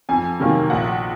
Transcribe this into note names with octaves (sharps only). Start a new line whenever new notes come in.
F2 G#5
C3 D#3 F#3 A#3
A#1 F#5